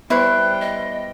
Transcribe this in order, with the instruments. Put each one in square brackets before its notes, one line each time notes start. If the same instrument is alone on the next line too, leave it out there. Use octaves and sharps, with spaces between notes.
[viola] G3 G5 [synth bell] B3 B4 C5 [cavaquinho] E4 [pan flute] F#6
[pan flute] D#5